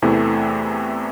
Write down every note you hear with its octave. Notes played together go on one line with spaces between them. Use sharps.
E2 C3 E3 A3